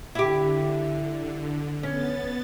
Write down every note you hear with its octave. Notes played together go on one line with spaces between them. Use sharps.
D3 E4 G4
B3 C#4 A6